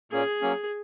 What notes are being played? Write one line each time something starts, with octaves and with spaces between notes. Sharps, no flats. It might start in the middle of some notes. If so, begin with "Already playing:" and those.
A#2 A#3 C#4 G#4
F#3 A#3 C#4